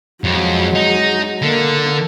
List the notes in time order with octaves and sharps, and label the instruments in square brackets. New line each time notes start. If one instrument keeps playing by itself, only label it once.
[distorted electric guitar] F2 [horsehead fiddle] F#3 G#3
[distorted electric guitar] D#4
[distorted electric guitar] D3 [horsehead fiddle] A#3